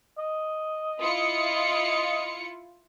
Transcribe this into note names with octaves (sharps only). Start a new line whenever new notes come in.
D#5
E4 F4 C#7